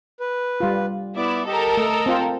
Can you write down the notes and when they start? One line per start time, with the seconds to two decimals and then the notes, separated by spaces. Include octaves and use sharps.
0.20 B4
0.60 G3 F4
1.17 B3 E4 D5 D6
1.47 G4 A4 A#4 D#5
1.77 A3 D#5 E6
2.06 C4 F4